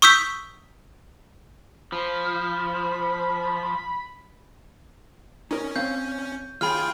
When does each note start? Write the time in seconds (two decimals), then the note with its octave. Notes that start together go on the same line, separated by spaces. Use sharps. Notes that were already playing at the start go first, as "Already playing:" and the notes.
0.02 C#6 D#6 E6 G6 B6
1.92 F3 B5
5.51 C#4 D#4 A#4
5.76 C4 C#5 F5 G6
6.61 D#2 F4 G#4 G5 B5 F6